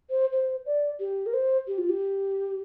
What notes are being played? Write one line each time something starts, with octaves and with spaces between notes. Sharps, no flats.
C5
C5
D5
G4
A#4
C5
G4
F4
G4